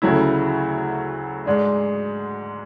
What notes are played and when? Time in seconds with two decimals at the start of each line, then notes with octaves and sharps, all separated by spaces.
0.02 D2 C#3 F#3 A3 E4
1.46 G#2 G#3 D4